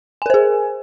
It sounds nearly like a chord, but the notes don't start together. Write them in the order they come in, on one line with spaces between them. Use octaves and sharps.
G#5 A#4 C5 G#4